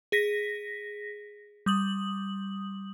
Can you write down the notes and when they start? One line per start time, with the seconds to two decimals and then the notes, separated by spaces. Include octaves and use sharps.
0.12 G#4 A#6 B6
1.66 G3 D#6 F#7